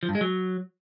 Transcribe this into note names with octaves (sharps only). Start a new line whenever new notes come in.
F3
G2
G#3
F#3